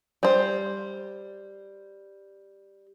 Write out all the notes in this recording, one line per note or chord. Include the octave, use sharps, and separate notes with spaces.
G3 C5